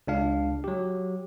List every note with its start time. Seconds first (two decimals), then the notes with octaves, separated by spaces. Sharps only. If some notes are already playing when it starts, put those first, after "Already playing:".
0.07 C#2 D4 F5
0.64 F#3 G4